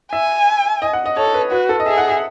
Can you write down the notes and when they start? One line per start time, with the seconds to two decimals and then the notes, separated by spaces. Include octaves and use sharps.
0.13 E5 G#5
0.82 D#5
0.93 F#5
1.06 D#5
1.17 A4 C#5
1.34 B4
1.51 F#4 B4
1.69 A4
1.80 D#5
1.86 G#4 E5
1.97 F#5
2.10 E5